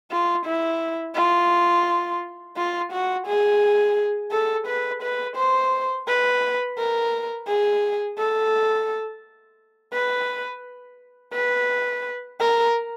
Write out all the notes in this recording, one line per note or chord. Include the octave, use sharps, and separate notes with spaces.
F4
E4
F4
F4
F#4
G#4
A4
B4
B4
C5
B4
A#4
G#4
A4
B4
B4
A#4